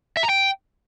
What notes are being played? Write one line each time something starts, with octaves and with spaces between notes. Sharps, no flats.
E5
A#5
G5